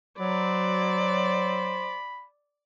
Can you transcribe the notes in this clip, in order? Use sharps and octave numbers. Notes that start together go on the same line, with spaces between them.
F#3 C5 D5 B5